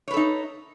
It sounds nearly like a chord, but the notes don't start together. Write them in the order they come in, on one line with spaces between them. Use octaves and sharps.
C#5 B4 A4 D#4